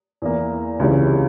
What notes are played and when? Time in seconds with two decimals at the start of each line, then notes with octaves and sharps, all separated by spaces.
0.22 E2 E3 A#3
0.79 C#2 C3 E3 G#3 C#4